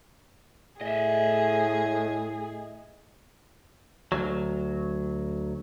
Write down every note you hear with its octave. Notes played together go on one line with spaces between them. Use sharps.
A2 G#4 D#5 E5
D2 F#3